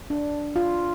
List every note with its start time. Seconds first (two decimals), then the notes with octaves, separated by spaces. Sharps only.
0.10 D4
0.56 F4